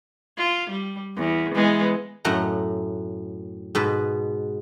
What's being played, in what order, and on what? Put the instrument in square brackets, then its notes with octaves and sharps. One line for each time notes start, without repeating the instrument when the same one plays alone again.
[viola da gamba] F4
G3
E2
E3 G#3 B3
[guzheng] F#2 A2 A3 D#5 F#5 A#5
G#2 B2 B4